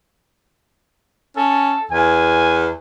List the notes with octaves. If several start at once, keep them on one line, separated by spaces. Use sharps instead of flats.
C#4 A4
E2 G#5